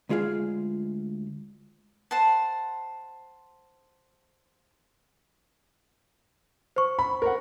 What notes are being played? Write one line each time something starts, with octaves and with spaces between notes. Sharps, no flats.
D2 G#3 F4 G#4 F5
C5 F#5 A5
C5 C#6
B5
A#4 F#5